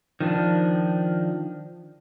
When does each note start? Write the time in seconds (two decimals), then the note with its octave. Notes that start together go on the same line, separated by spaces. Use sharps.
0.20 D#3 F3 D4